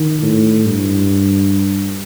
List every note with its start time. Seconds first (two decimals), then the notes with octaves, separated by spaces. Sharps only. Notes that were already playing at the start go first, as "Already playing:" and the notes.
Already playing: D#3
0.23 A2
0.65 G2